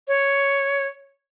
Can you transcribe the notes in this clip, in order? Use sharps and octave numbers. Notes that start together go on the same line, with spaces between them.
C#5